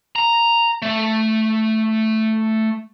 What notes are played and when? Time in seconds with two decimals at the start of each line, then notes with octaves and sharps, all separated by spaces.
0.16 A#5
0.82 A3